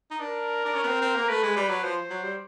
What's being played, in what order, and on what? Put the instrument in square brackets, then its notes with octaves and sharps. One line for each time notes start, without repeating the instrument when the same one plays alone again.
[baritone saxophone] D#4
[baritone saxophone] D4 [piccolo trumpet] A#4
[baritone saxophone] D4
C#4
B3
C4
C4
A#3
[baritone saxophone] A3 [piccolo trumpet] B4
[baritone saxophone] G#3
G3
F#3
[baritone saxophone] F3 [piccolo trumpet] C5
[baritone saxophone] F#3
G3